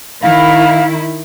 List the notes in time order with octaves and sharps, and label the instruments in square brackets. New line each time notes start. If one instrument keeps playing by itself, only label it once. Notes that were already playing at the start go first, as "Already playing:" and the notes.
[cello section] D#3 E4 [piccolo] F5